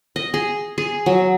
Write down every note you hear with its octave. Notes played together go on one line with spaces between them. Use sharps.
D#5
G#4
G#4
F#3